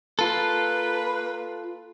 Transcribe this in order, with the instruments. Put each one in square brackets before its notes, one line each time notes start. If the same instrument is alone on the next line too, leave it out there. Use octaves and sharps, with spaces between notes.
[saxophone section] A#3 B4 [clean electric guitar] F4 A4